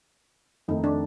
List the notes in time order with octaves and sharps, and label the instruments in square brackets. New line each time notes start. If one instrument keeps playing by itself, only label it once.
[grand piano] F2 D#3 A3 [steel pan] D#4
[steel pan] D4